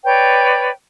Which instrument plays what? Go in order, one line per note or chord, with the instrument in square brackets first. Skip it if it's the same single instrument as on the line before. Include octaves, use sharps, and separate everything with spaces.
[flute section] B4 C#5 D5 G5